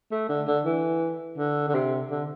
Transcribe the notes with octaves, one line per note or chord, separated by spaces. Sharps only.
A3
D3
D3
E3
D3
D3
C3
D3